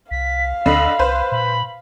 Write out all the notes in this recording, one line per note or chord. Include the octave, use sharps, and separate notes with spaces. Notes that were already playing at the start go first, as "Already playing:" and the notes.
C2 F5 B6
D2 D3 D#5 B5 C7
C2 B4 C5
A#2 B5